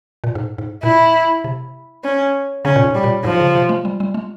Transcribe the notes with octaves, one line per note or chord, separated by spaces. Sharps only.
A#2
G#2
G#2
A#2 E4
C3
C#4
C#3 C#4
A#2
G#2
G3
A#2
G#2 F3
C#3
C3
G#3
G3
G3
G#3